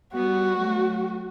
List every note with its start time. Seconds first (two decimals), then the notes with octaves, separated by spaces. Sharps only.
0.14 G3 B3 F#4
0.59 F#3 A3